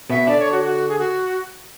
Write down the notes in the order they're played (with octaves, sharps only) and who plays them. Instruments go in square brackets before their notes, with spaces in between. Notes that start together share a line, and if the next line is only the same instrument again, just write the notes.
[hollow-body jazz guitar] B2 B3 [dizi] E5
[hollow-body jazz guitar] D3 D4 [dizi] D5
[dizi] C#5
F#4
F#4
G#4
F#4